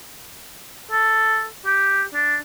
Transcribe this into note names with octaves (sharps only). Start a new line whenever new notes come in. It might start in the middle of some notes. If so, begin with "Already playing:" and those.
A4
G4
D4